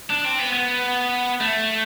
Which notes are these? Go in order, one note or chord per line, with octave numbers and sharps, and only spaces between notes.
D4
C4
B3
B3
A3